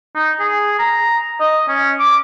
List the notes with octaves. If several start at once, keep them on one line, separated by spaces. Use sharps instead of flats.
D#4
G#4
A#5
D#5
C#4
D6